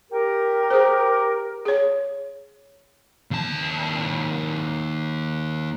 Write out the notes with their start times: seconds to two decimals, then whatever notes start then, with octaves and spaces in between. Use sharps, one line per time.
0.11 G4 A#4
0.70 G#4 C5
1.65 G#4 C#5
3.31 D#2 A5